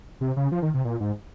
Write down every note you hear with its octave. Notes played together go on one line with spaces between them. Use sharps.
C3
C#3
F3
D#3
C3
A#2
G#2